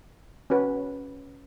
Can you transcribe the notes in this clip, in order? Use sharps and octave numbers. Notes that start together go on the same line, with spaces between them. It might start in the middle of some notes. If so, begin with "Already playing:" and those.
C#4 F#4 B4